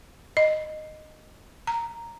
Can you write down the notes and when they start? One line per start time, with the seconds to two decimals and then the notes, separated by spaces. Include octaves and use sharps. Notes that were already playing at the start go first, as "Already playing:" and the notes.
0.37 D#5
1.67 A#5